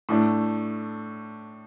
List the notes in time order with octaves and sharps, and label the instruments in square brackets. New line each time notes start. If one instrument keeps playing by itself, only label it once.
[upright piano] A2 A3 D4